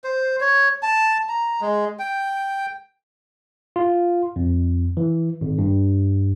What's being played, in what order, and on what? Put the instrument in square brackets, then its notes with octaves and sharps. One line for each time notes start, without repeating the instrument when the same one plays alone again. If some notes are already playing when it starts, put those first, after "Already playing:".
[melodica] C5
C#5
A5
A#5
G#3
G5
[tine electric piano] F4
F2
E3
G#1
G2